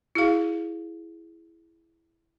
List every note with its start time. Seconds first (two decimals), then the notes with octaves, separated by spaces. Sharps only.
0.15 E4 F#4 G#4 F5